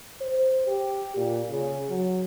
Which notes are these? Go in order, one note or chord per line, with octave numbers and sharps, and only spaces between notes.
C5
G4
A#2
C#3
F#3